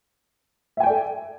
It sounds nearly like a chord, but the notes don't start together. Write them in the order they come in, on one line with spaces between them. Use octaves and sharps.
E5 G#5 G5 D5 A4